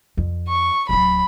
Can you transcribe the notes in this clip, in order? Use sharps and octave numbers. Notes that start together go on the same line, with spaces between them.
F2
C#6
D1 F#3 B5